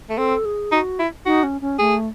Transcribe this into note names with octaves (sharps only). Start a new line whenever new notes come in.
A3
C4 A4
G#4
D#4 F#4
E4
D#4 F#4
C#4
C#4
A3 G#4